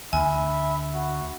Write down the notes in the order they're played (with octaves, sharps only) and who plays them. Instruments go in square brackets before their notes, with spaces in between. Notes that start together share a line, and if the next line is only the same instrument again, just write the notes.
[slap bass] D2 [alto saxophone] E5 [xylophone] G#5 [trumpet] B5
[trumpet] F#4